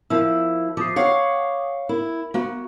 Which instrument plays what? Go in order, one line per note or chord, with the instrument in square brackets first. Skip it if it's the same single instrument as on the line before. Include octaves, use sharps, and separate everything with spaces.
[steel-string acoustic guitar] F3 E4 [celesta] A#4 E6
[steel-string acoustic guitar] F3 [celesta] D6 D#6 C7
[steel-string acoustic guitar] C#5 F5 F#5
[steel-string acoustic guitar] E4 [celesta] A#4
[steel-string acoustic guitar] A#3 F#4